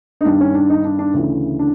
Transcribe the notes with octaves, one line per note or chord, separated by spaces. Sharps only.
D#4
G2 D#3 D4
C#4
D4
D#4
D4
D4
D2 C#3 E3
D4